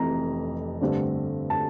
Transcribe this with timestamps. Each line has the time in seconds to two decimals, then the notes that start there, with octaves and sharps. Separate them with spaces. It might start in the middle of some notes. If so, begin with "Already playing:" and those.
Already playing: F1 F2 C3 E3 A#5
0.81 G2 D3 A3 C4
1.50 A5